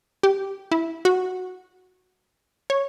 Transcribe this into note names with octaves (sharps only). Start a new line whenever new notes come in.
G4
E4
F#4
C#5